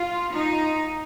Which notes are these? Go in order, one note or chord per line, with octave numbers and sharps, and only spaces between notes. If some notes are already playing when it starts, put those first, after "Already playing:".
Already playing: F4
D#4